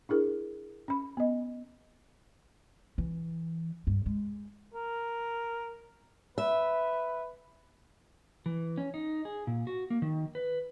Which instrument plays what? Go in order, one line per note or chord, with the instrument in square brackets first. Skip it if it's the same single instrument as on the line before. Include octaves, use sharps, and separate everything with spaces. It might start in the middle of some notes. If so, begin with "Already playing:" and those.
[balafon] D4 E4 G#4 A#4
C#4 B5
B3 D#5
[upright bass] E3
G2
G#3
[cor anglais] A#4
[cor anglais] B4 [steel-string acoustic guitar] E5
[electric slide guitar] E3
C#4
D#4
G#4
A#2
F#4
A#3
D#3
B4